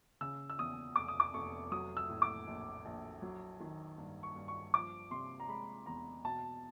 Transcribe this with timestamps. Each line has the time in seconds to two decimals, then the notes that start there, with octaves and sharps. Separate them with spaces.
0.21 C#3 E6
0.50 E6
0.59 E2 D#6
0.96 F1 D6
1.08 D#6
1.20 D6
1.34 F1 C#6
1.71 F#3 D#6
1.97 E6
2.09 A2
2.22 D6
2.47 A#1
2.85 A#1
3.22 F#3
3.60 D#3
3.98 G2
4.23 C#6
4.36 G2
4.48 C#6
4.74 F3 D6
5.11 C3 C6
5.40 A#5
5.48 G#3 B5
5.86 E2 A#5
6.25 B2 A5